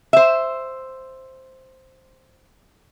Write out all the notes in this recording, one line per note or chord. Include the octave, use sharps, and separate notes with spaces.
C5 E5